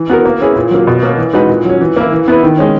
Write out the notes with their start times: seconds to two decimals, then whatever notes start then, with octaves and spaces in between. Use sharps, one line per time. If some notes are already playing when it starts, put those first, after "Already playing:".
Already playing: E3
0.10 B3 F#4 A#4
0.25 A#3
0.41 C#4 E4 G#4 B4
0.56 A#2
0.71 F#3 A#3
0.87 B2
1.02 A#3 C#4
1.18 E3
1.33 G#3 D#4 F#4 B4
1.49 A#2
1.65 F#3 C#4
1.81 E3
1.96 A#3 E4
2.12 E3
2.28 B3 E4 B4
2.43 D#3
2.58 G#3 C#4